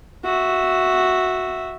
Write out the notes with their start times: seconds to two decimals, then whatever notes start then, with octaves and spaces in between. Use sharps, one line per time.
0.24 F#4 E5